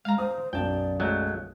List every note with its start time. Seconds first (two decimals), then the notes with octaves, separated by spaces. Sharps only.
0.05 G#3 F5 A#5
0.18 C5 D#6
0.53 B1 F#2 D5 G5 A5
1.00 F#3 G#3 A3